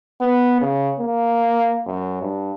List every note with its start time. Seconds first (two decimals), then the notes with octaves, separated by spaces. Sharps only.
0.21 B3
0.61 C#3
1.00 A#3
1.87 F#2
2.22 G2